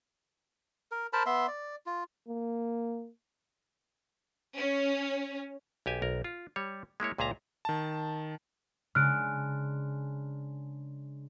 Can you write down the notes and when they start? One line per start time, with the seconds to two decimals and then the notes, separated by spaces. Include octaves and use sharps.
0.91 A#4
1.13 A#4 C5 A5 B5
1.26 B3 E5 C6
1.48 D5
1.86 F4
2.28 A#3
4.57 C#4
5.86 B1 G4 G#5
6.02 B1 A#4
6.24 F4
6.56 G3 C#5
7.00 G#3 A#3 E4 C#5
7.18 C#2 A#2 G#4 E5 A5 A#5
7.65 D#3 A5
8.95 C#3 G#3 D4 F6 F#6 D7